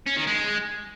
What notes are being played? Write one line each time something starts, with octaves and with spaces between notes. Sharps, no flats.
C#4
D#3
G#3